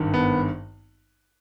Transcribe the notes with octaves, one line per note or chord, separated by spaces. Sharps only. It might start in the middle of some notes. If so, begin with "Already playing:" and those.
Already playing: G#1 G2 D#3
B3